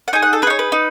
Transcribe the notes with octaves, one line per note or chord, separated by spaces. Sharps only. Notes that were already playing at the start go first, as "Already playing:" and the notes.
F#5
D#4 G#4 G#5
F#5
A4
D#4 G#4 B4 C#5
B4
D#4